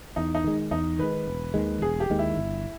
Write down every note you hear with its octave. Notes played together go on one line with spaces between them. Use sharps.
E2 D#4
D#4
D#3 G#3
E2 D#4
D#3 G#3 B4
E1
D#2 D#3 G#3
E1 G#4
G4
D#2 D#3 G#3
E4
G1